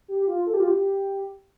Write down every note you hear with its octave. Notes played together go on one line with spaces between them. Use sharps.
G4
F4
A4
G4
F4
G4